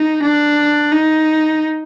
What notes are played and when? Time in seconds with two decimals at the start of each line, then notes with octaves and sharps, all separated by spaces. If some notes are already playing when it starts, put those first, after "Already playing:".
Already playing: D#4
0.23 D4
0.92 D#4